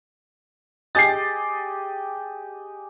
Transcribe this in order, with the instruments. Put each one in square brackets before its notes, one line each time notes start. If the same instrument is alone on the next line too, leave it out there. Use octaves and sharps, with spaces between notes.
[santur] G4 G#4 D#5 [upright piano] A6 C7